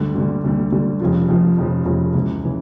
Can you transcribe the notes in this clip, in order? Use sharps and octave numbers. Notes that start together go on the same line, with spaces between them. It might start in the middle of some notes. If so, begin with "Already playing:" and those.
Already playing: D2 D3 G3
D2 D3 G3
D2 D3 G3
D2 D3 G3
F1 F2 C#3 F3
F1 F2 C#3 F3
F1 F2 C#3 F3
F1 F2 C#3 F3
C#2 C#3 E3
C#3 E3